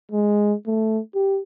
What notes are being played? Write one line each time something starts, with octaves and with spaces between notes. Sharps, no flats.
G#3
A3
G4